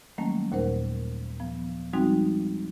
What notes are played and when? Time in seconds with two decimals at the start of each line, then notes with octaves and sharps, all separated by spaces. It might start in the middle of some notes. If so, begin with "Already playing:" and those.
0.18 D#3 F#3 G3 A3 A#3 C#4
0.52 D#2 A#2 A#4 C5 F#5
1.40 F3 B3
1.93 F3 G3 G#3 C4 D#4 F#4